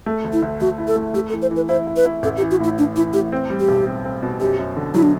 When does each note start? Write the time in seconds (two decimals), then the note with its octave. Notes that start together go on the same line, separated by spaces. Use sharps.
0.06 A3
0.24 D2
0.33 E4
0.42 D2
0.60 D2 F#4
0.78 E4
0.87 A4
0.96 A3
1.14 A3 G4
1.29 A4
1.33 E3
1.42 C5
1.51 E3
1.56 B4
1.68 E4 C5
1.87 E4
1.96 B4
2.05 E4
2.23 A1 A4
2.37 G4
2.41 E3
2.51 F#4
2.60 A2 E4
2.78 E3 D4
2.96 E3 E4
3.13 A2 G4
3.32 C4
3.50 G3
3.60 G4
3.68 B1
3.86 C4
4.05 C4
4.23 B2
4.40 F#2 G4
4.59 F#2
4.77 D3
4.94 F#3 E4
5.03 D4